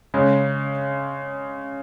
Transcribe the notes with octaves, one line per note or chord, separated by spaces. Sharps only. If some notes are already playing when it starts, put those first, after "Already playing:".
C#3 G#3 C#4